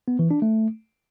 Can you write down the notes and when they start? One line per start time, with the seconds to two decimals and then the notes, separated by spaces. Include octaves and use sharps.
0.08 B3
0.19 E3
0.31 D4
0.42 A3